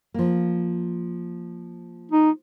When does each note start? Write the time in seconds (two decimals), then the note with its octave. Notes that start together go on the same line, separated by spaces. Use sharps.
0.14 F3 A#3
2.12 D#4